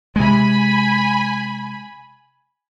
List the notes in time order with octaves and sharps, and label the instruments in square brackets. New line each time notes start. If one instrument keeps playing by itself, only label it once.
[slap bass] C3 G#3 [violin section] G#5 B5